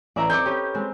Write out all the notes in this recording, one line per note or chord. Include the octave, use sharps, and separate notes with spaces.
A1 D5 E5 A#5
C4 A4 D#5 D6 G6
C#4 G4 B4
G#3 C4